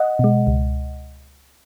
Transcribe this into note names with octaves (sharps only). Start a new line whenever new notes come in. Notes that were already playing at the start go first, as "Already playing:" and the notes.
Already playing: D#5 F#5
B2 G#3
C#2